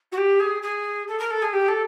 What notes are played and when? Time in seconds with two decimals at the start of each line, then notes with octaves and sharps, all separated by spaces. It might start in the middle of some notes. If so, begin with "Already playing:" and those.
0.11 F#4
0.17 G4
0.39 G#4
0.62 G#4
1.07 A4
1.19 A#4
1.30 A4
1.41 G#4
1.52 G4
1.68 A4